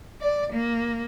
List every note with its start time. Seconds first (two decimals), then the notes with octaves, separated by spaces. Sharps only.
0.22 D5
0.53 A#3